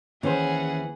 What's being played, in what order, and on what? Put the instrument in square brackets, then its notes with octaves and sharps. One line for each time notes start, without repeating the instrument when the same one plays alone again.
[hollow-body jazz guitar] D#2 C5 [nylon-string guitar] E3 C#4 [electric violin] G#4 F#5